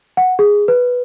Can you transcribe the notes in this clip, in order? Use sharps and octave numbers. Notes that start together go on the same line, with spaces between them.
F#5
G#4
B4